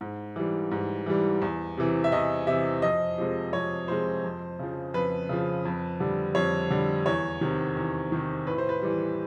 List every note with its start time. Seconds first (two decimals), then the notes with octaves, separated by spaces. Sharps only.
0.01 G#2
0.36 E3 G3
0.71 G#2
1.06 E3 G3
1.42 E2
1.77 C3 E3
2.04 E5
2.12 E2 D#5
2.47 C3 E3 E5
2.82 F2 D#5
3.18 C3 F3 G#3
3.53 F2 C#5
3.88 C3 F3 G#3 C5
4.24 F2
4.59 C#3 F3
4.94 F2 B4
5.29 C#3 F3
5.65 F2
6.00 D3 G3
6.35 F2 C#5
6.71 D3 G3
7.06 E2 C#5
7.41 C3 D#3
7.77 E2
8.12 C3 D#3
8.47 A2 B4
8.58 C5
8.69 B4
8.82 E3 G3